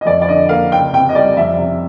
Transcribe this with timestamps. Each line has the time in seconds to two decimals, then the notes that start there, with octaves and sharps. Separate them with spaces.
0.01 D#5
0.06 F2 D5
0.22 D5
0.28 D3 D#5
0.49 A#3 F5
0.71 C#2 G5
0.93 C3 G5
1.09 D#5
1.15 G3 D5
1.37 F2 E5
1.58 C3